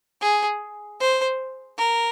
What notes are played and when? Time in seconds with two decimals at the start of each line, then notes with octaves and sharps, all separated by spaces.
0.21 G#4
1.00 C5
1.78 A#4